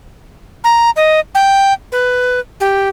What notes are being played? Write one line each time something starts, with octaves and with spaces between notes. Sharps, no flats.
A#5
D#5
G5
B4
G4